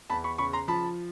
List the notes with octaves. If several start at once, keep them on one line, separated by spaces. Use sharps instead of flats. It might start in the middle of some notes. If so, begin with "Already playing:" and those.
E2 A5 B5
B5 C#6
C#3 B5 C#6
A#5 C6
F3 A5 B5